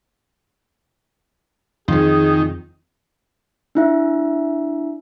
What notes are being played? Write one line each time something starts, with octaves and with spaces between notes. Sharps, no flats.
F2 D#3 F3 G#4
D4 E4 E5